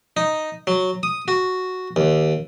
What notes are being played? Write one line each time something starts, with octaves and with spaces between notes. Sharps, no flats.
D#4
F#3
D#6
F#4
D#2